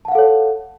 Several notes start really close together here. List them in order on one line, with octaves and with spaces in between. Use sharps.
A5 F#5 F5 A4 C#5